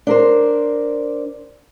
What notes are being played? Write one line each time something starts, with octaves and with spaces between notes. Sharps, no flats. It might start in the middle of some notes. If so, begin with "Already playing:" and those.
D4 A#4 C5